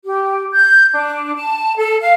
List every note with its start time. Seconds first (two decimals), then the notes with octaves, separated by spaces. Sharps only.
0.04 G4
0.51 G6
0.94 D4
1.35 A5
1.76 A4
2.00 F5